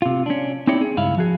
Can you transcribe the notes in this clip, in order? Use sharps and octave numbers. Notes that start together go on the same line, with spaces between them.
C3 F4
C#4 D4
C4 D#4 E4 G4 C#5 D5
G#4
C#2 G2 E4 F5
F3 F#4 G#4